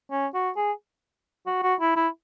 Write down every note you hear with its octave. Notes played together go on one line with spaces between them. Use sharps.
C#4
F#4
G#4
F#4
F#4
E4
E4